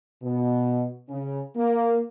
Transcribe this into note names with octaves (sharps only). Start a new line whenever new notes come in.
B2
C#3
A#3